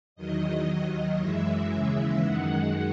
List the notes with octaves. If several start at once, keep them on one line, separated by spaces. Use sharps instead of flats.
E2 D#3 F#3 D#5
D#2 D#3 F#3
F#2 E3 G#3 E5
D#2 C#3 E3 G#3
F#2 D#3 G#3 F#5